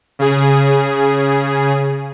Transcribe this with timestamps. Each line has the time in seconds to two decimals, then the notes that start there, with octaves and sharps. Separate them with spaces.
0.19 C#3 G#4